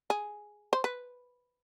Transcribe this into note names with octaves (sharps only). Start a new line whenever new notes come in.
G#4
C5
B4